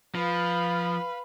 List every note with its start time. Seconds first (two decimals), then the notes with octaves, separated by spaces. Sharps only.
0.15 F3 B4 F5